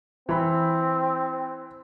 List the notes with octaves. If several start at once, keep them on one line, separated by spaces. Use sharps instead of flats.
E3 C4 B5